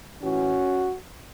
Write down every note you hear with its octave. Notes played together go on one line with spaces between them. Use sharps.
A2 E3 C#4 F#4